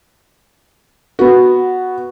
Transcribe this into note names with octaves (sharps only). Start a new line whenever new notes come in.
B3 F#4